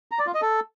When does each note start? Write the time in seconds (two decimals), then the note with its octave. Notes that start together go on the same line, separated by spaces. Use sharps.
0.11 A#5
0.19 D5
0.27 F4
0.34 D#5
0.42 A4